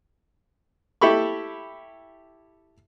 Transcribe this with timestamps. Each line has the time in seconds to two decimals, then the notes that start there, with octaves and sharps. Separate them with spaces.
1.01 E4 G4 A4 B5 C#6